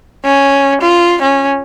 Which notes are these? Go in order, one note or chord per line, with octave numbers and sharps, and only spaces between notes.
C#4
F4
C#4